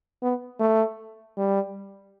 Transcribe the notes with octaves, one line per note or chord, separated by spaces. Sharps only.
B3
A3
G3